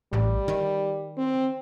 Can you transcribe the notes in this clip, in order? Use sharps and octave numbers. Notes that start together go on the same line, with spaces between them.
A1 G3
D#3
C4